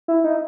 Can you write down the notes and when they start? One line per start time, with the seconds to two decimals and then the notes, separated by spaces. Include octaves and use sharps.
0.08 E4
0.24 D#4